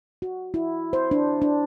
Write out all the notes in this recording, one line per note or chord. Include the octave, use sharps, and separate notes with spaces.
F#4
E4
C5
D4
D4